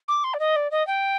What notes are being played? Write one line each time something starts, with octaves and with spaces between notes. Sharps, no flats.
D6
C6
D5
D#5
D5
D#5
G5